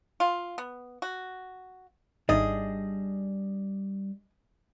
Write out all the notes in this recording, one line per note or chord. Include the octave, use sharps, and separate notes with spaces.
F4
B3
F#4
G#1 G#2 G3 D4 D#4 G#4 D#5